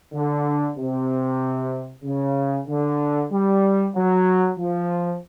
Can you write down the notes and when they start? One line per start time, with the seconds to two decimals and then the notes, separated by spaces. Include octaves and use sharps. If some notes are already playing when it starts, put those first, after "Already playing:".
0.13 D3
0.76 C3
2.03 C#3
2.67 D3
3.31 G3
3.94 F#3
4.58 F3